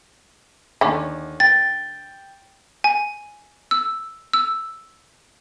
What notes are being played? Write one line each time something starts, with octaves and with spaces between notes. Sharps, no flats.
D#2 D3 C#4
G5 A6
G#5
E6
E6